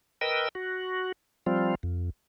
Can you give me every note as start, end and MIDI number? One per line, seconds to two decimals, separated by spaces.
0.21 0.48 70
0.21 0.48 71
0.21 0.48 75
0.21 0.48 79
0.21 0.48 88
0.55 1.12 66
1.46 1.75 53
1.46 1.75 55
1.46 1.75 60
1.46 1.75 65
1.83 2.10 41